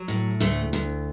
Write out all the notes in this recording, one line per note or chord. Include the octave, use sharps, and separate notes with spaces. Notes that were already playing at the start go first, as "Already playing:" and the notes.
Already playing: F#3
A2
D2 A3
D2